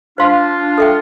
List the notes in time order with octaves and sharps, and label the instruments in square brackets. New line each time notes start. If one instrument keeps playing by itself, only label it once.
[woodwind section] D4 F4 [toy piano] C5 F5 C6
[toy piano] A4 E5 G5